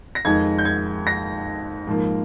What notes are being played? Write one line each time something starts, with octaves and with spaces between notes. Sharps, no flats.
A#6
F2 D#3 G#3 D#4 G#6
G6
G#6
A#6
G#2 F3 A#3